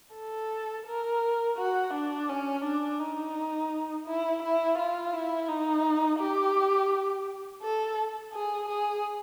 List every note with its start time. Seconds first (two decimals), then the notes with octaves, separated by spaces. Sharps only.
0.15 A4
0.86 A#4
1.57 F#4
1.94 D4
2.29 C#4
2.64 D4
2.99 D#4
4.06 E4
4.42 E4
4.78 F4
5.13 E4
5.48 D#4
6.20 G4
7.62 A4
8.33 G#4
8.68 G#4